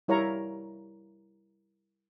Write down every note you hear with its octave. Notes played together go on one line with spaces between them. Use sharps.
G3 E4 A#4 C#5 F5 A#5